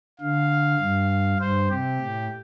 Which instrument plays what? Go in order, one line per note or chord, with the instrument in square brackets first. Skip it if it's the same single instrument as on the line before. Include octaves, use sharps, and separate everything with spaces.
[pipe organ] D3 [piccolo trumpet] F5
[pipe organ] G2
[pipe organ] G2 [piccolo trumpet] C5
[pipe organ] C3 [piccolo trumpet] G4
[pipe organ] A2